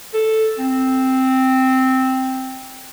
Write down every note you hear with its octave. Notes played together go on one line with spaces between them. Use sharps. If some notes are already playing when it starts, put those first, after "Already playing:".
A4
C4